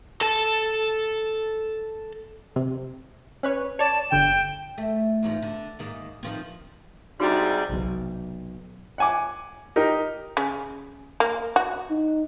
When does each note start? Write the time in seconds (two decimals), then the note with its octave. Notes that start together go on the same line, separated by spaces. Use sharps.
0.21 A4 A5
2.56 C3
3.43 C#4 B4 C#5
3.79 C#5 D5 A5
4.11 G1 D3 G5 E7
4.78 A3
5.23 E2 G#2 F3
5.42 D3
5.79 G#2 D#3 A#3
6.23 D#3 F3 C4
7.20 G#2 C3 G3 D4 D#4 F#4
7.69 B1 C3
8.98 F#5 G#5 D6
9.76 D#4 G4 A#4
10.37 C#3
11.20 A#3
11.56 F#4
11.90 D#4